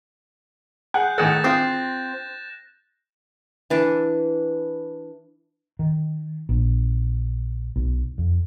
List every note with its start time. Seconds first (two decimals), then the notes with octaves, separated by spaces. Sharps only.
0.94 G#4 F#5 F#6 G6
1.18 A2 D#3 G#4 F#5 A6 A#6 E7
1.44 C4 F4 D#6
3.70 E3 D4
5.79 D#3
6.49 A#1
7.76 B1
8.18 F2